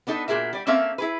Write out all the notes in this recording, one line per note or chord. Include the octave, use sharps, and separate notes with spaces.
B3 D4 D#4 A4
A#2 F#4 G#4 A#4 E5
G3 D5
A#3 C4 C#4 A4 E5 F5
E4 G#4 B4